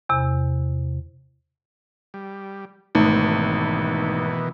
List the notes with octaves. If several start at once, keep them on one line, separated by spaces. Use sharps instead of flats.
E2 C3
G3
G#1 B2 D#3 E3 A3 D#4